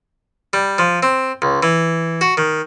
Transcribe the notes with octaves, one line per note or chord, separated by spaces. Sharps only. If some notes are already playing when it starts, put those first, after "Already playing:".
G3
F3
C4
C#2
E3
F#4
D#3